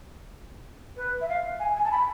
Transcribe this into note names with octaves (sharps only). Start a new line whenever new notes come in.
B4
E5
F5
G#5
G#5
A5
B5